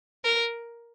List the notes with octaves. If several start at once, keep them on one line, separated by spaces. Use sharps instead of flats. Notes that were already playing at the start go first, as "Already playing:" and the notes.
A#4